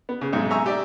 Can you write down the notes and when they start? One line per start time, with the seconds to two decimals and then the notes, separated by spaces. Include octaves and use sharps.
0.09 B3
0.21 C#3
0.33 B1 G#2 C3
0.51 E5 G#5 A#5 C#6 E6
0.66 G4 D5 E5